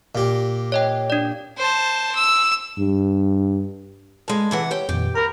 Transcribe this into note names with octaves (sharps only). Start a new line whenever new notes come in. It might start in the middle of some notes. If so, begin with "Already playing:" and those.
A#2 G4
C#5 D#5 G5
D4 D5
C5 A5
E6
G2
G2 G#3 G#4 A4 A5
C3 E3 F#5
G4 B4 C#5 G5
F2 A#2 D#3 G4
A#4 A#5 B5